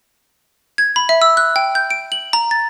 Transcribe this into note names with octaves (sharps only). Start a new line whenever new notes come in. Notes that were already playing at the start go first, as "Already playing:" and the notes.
G#6
B5
E5
E6
F#6
G5
G6
D7
F#7
A#5
A6